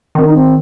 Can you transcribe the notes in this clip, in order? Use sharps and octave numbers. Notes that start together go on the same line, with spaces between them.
D#3 C4
D#4
C4